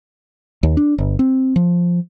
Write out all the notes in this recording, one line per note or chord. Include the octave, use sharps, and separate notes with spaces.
D#2
D4
G1
C4
F3